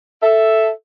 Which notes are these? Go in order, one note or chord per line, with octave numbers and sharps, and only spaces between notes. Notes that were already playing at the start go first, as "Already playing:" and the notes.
A4 E5